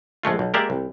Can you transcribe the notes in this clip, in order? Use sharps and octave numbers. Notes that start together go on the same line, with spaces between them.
A#1 G#3 A3 F4
B1
G#3 A#3 G4 A#4 D5 E5
C2